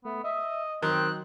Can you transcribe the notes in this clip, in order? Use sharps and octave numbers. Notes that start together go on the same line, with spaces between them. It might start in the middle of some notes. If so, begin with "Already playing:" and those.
A3 B3
D#5 E5
D#3 F#3 C4 F#6